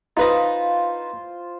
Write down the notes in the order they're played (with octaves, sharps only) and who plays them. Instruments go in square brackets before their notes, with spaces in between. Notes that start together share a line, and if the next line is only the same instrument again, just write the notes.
[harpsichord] D#4 B4 D#5 [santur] F4 C5